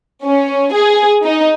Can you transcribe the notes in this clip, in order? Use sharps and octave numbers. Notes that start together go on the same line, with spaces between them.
C#4
G#4
D#4